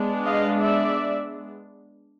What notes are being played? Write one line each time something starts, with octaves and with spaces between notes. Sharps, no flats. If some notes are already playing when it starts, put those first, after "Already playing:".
Already playing: G#3 B3 D4
D#5 F5
D5 E5